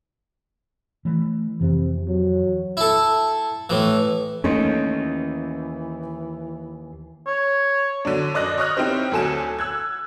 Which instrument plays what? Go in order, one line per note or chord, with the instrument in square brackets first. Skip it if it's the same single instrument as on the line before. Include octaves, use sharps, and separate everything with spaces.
[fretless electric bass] E3 A3
[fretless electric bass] F2 E3 [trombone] C3
[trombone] F#3
[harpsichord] E4 A4
A2 E3
[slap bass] D#2 [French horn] E3 [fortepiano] A3 A#3 D#4 [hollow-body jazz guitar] C#4 C6
[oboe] C#5
[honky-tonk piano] D3 F#3 D4
F#2 D5 D#5 F#6 A#6
C#5 D#5 C#6 D#6 F6 F#6
C4 D#4 E4 G4 C5
D2 F#3 A4 G#5 E7
E6 F#6 G#6